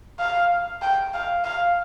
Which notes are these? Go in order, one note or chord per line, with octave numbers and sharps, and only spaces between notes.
F5
G5
F5
F5